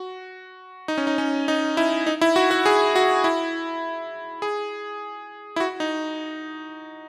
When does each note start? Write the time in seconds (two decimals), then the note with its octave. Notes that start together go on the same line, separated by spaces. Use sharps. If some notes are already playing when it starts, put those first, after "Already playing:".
Already playing: F#4
0.88 D#4
0.98 C#4
1.07 D#4
1.18 C#4
1.48 D#4
1.77 E4
2.07 D#4
2.21 E4
2.36 F#4
2.51 F#4
2.66 G#4
2.95 F#4
3.24 E4
4.42 G#4
5.56 E4
5.60 F#4
5.80 D#4